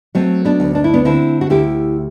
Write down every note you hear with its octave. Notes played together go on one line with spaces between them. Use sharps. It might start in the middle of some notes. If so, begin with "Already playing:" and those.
F#3 A3 C4
B3 D4
D2
D4
E4
B3 D4
D3 C4 E4
F#4
D2 E4 G4